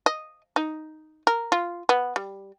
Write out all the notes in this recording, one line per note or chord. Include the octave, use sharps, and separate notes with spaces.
D#5
D#4
A#4
F4
B3
G3